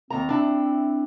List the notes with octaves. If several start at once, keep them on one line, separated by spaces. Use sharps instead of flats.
D#2 C4 A#5
D4 E4